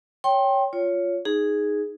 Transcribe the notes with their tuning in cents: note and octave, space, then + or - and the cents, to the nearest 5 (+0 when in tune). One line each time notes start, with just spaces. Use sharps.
C#5 +5 G5 +0 C6 +30
F4 +0 C#5 +15
D#4 +0 G#4 +0